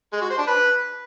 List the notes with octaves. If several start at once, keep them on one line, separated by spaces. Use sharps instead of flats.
G#3
F#4
C5
D4
B4